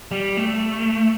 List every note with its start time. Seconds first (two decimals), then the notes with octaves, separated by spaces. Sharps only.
0.11 G3
0.37 A3